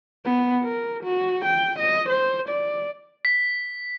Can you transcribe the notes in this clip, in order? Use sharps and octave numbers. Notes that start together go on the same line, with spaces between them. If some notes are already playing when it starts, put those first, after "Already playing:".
B3
A#4
F#4
G5
D#5
C5
D5
B6